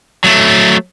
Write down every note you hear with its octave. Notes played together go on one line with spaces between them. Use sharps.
F#3 A3